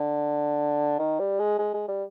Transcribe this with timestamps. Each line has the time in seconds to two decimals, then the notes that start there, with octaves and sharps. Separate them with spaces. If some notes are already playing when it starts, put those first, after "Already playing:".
Already playing: D3
0.99 D#3
1.19 G3
1.39 G#3
1.59 G#3
1.74 G#3
1.88 G3